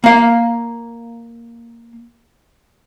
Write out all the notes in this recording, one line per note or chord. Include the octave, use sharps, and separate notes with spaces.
A#3 F5